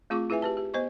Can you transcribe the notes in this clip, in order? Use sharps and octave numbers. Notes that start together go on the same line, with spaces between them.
A3 C4 F4 G#4 C#6 D6
E4 G#4 B4 E5 G#5
G4 B4 A5
G4
B3 C5 D#5 C#6